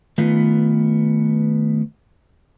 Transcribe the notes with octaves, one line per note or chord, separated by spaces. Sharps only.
D#3 A3 B3 F4 B4